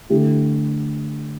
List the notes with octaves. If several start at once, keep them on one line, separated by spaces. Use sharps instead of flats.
D3 A3 E4 G4